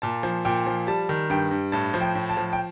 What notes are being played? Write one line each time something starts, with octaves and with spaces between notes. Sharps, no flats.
A#2 A5
F3
A#2 G5
F3
G3 A5
D#3
G2 G5
G2
A2 A5
F3
G5
A2
A5
F3
G5